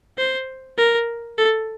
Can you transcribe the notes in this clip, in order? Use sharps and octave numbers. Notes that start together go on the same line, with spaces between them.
C5
A#4
A4